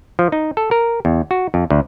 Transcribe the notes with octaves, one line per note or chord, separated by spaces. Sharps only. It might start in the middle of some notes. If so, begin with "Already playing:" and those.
F3
D#4
A4
A#4
E2
F#4
F2
D2